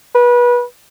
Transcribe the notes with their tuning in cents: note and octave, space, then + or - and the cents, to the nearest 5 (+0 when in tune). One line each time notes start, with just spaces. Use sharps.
B4 -25